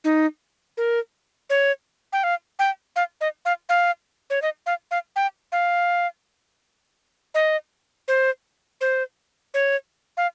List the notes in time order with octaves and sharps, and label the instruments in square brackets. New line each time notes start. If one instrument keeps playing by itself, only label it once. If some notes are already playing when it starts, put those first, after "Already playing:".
[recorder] D#4
A#4
C#5
G5
F5
G5
F5
D#5
F5
F5
C#5
D#5
F5
F5
G5
F5
D#5
C5
C5
C#5
F5